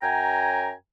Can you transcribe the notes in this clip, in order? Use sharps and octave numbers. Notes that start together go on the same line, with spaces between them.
F#2 G5 G#5 A#5